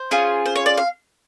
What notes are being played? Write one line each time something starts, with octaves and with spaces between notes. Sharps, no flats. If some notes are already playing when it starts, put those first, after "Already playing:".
Already playing: C5
C#4 F4 G#4
C5
C#5
D5
F5